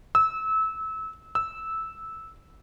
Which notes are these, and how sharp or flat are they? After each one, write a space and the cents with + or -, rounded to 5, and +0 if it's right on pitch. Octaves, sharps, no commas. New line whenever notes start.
E6 -25
E6 -10